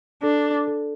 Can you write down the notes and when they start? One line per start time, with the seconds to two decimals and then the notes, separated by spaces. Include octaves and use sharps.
0.22 D4 A4
0.67 A4